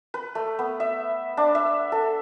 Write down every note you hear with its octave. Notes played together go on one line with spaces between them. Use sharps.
B4
A3
B3
E5
D4
E5
A4